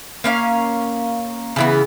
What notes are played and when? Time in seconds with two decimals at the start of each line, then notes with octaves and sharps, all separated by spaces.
0.24 A#3 C#4 F5
1.56 C#3 E3 B3